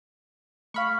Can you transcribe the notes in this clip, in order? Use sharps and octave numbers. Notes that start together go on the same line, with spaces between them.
A3 F5 B5 C#6 F6